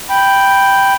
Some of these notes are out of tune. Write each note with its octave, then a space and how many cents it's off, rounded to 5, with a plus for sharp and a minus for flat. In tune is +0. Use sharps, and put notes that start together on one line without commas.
G5 +0 B5 +0